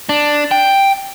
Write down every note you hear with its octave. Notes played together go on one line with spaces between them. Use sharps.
D4
G5